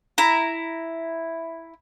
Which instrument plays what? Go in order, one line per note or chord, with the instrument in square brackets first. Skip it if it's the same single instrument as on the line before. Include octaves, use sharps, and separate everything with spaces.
[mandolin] E4 A#5